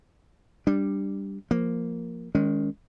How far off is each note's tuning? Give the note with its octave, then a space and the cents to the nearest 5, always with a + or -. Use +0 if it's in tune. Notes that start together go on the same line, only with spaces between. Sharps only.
G3 +5 D4 +0
F3 +0 A#3 +0
D#3 +0 G#3 +0 C#4 +30